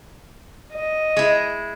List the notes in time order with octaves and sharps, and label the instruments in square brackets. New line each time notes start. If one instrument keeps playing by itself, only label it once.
[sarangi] D#5
[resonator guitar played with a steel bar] G#3 E4